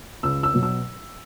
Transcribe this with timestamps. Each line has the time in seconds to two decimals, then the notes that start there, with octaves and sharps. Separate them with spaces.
0.23 C#2 E6
0.43 E6
0.54 B2 F#3
0.63 E6